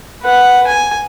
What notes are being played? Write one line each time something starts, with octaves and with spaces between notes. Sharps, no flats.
B4 F#5
G#5